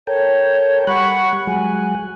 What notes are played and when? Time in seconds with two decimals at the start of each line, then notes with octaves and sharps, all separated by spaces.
0.07 A4 A#4 C#5 G5
0.87 G3 F#5 B5 C#6 F#6
1.47 F#3 G#3 F#5 G#5